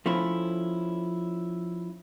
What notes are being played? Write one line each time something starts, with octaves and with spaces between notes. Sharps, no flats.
F3 A3 C#4 E4